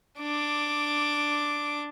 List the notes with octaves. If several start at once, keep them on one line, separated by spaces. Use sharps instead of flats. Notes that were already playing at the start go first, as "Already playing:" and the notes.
D4 D6